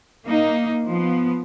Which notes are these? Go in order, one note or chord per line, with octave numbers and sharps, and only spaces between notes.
A#3 D#4
F3 B3